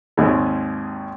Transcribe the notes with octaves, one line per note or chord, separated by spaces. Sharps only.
G#1 D#2 G#2 G#3